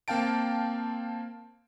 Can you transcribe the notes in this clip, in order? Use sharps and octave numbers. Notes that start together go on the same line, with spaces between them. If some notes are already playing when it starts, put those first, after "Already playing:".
A#3 C4 F5 G5 A5 D7